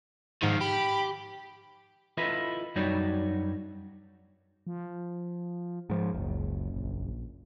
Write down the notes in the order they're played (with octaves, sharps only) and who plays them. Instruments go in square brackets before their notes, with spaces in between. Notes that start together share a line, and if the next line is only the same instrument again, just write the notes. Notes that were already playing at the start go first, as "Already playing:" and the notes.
[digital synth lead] G#2 [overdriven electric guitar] D#3 F3
[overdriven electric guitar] G4 [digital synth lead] B5
[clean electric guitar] E4 F4 A4 B4 D#5 E5
F#2 G3 D#4 F#4 C#5 D5
[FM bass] F3
[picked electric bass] G#2 F3
[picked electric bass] F#1 [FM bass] C#2
[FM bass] A#1